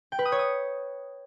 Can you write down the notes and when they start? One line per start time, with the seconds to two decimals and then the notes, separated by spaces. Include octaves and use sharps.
0.12 G5
0.19 B4
0.25 D#6
0.32 C#5
0.39 D#6